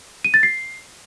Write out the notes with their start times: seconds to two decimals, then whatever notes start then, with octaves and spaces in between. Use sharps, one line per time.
0.24 D#7
0.34 A6
0.43 C7